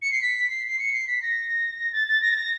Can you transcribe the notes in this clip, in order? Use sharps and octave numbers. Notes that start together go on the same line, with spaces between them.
C#7
C7
B6
C7
C7
C#7
C7
B6
A#6
A6
A6
A#6
A6
A#6